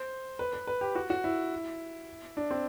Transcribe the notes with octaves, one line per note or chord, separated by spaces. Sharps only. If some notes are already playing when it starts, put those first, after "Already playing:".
Already playing: C5
B4
B4
B4
G4
F#4
F#4
E4
D4
C4